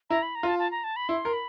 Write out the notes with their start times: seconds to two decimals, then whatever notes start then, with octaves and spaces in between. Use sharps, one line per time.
0.10 E4 A#5
0.22 B5
0.35 A#5
0.43 F4 A5
0.59 A5
0.71 A#5
0.84 A5
0.96 B5
1.09 E4 C6
1.25 A#4
1.33 B5